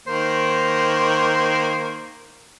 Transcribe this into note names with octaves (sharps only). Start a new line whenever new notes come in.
D#3 A#3 C5